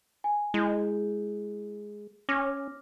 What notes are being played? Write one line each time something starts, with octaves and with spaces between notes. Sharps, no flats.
G#5
G#3 E4 G6
C#4 D6 F6 A#6